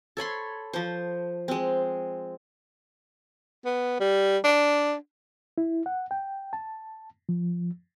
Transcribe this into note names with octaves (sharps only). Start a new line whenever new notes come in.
A4 C#5 B5 C6
F3 C5
G#3 C4
B3
G3
D4
E4
F#5
G5
A5
F3